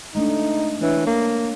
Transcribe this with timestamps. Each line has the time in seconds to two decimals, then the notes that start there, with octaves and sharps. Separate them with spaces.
0.15 G#3 A3 D4 D#4
0.82 E3 D4 C#5
1.06 A#3